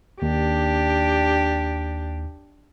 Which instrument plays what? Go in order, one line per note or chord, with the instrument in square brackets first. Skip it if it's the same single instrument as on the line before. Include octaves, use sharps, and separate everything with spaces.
[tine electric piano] D#2 [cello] D4 G4